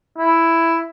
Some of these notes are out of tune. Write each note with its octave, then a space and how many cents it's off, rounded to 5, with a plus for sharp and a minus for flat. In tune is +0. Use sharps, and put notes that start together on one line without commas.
E4 +5